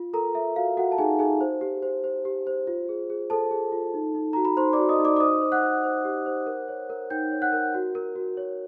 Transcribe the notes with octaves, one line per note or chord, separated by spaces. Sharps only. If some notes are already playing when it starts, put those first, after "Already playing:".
Already playing: F4
A4 A#4 A#5
A4 E5
F#4 F5
F#4 A4 F#5
A5
D#4 G#4 G#5
D#4 G#4 G#5
C5
G4
C5
C5
G4
C5
F4
G#4
G#4
A4 C5 A5
G#4
F4
D#4
D#4
F#4 A#5
B5
D#4 C5 C6
D5 D6
F#4
D#5 D#6
D#4
D5 D6
D6
C5 D#5 D#6
C5
F#5 F#6
C5
C5
G4
C5
A#4
C#5
A#4
D#4 G5 G6
C#5
F#5 F#6
A#4
F#4
A#4
F#4
C#5